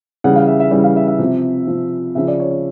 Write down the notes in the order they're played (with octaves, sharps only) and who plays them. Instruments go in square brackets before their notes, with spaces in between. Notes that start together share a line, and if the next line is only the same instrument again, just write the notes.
[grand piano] C#3 E3 G3 F#5
F5
E5
E5
C#3 E3 G3 E5
F5
E5
E5
C3 F3
C3 F3
C#3 F3 E5
D5
C#5
C#5